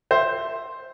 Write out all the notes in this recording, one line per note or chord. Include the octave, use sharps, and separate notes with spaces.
C5 E5